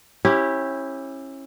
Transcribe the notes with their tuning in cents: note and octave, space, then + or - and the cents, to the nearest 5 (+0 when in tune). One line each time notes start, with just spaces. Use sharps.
C#4 -30 E4 -5 G4 +0